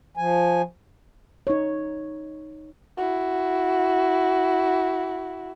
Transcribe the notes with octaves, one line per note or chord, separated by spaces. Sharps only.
F3 G#5
D#4 C#5
E4 F#4